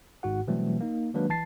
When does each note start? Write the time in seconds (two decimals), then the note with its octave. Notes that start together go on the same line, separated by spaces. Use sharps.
0.23 G#1 G#2 F#4 F#5
0.48 B2 E3 F#3 G3 A3 C4
0.81 A#3 D#4
1.14 D#3 F#3 G#3 A#3 D4 B4
1.29 A#1 E3 A5 A6 C7